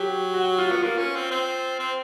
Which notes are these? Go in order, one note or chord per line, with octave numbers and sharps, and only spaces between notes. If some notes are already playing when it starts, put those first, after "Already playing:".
Already playing: F#3 G4
F#4
F4
B3
A#3 F4
C#4
C4
C4
C4